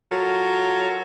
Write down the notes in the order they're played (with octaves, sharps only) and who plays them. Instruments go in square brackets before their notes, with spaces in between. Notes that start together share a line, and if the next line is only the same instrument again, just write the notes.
[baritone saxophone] F#3 [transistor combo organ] F4 A4 A#4